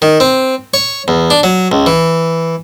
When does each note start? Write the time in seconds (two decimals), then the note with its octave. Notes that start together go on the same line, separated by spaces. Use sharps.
0.02 D#3
0.20 C4
0.74 C#5
1.08 E2
1.30 D4
1.43 F#3
1.72 C#2
1.86 E3